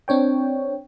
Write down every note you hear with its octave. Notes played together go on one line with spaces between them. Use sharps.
C4 D4 C#5 G5